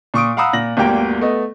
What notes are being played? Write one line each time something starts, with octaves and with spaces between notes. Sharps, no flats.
A#2 C#6 D#6 D7
F5 F#5 A#5 B5 D#6 E6
A#2 A#6 F#7
G1 D2 A#3 G4 G5
A3 B3 D#5